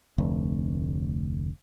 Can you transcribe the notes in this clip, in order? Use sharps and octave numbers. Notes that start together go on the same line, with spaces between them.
F1 D2